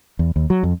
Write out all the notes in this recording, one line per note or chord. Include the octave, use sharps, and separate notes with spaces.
E2
D#2
F#3
F2